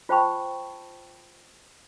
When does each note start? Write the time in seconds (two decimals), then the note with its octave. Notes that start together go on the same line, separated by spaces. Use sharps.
0.09 F4 C5 G5 A5 B5 C#6